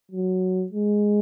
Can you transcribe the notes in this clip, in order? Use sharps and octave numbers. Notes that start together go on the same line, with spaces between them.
F#3
G#3